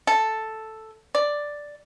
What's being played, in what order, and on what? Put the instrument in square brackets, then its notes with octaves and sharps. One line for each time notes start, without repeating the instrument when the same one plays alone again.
[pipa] A4
D5